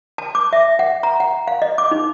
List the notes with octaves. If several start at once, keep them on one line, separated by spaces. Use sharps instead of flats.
A5
D6
E5
F#5
A#5
F#5
F5
D#5
D6
D#4